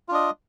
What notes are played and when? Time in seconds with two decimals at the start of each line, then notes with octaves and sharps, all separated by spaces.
0.09 F4
0.11 D4
0.14 D#5